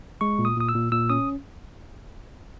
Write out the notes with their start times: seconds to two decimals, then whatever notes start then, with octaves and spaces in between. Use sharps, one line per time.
0.21 G#3 C#6
0.39 A#2
0.45 D#6
0.57 A#2 D#6
0.69 E6
0.75 A#2
0.92 A#2 E6
1.10 C#4 D#6